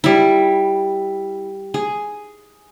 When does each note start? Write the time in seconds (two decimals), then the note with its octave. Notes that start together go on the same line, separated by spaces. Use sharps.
0.04 G3 E4
1.74 G#4